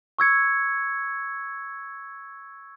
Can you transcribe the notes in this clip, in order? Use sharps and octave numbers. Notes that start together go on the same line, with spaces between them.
C#6 E6 G#6 C#7